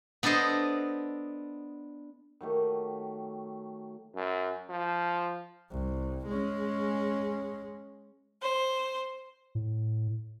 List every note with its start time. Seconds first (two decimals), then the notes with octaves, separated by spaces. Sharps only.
0.23 B3 D4 A4 C5 D#5
2.41 D#3 F#3 A3 G4
4.15 F#2
4.69 F3
5.71 C2
6.27 G#3 C#4
8.42 C5
9.55 A2